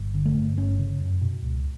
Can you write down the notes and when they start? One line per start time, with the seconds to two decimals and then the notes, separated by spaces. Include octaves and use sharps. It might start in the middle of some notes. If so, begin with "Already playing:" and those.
Already playing: G1
0.14 D3
0.25 A3
0.35 G2
0.57 G1 C#4
0.79 C#3
1.00 F#2
1.21 B2
1.42 C#2